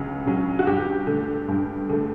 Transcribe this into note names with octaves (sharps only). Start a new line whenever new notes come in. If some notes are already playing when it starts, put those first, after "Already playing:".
Already playing: C#2 C#3 F#3
C#3 F#3 C#4
F#4
G2 G4
D3 A3
G2
D3 A3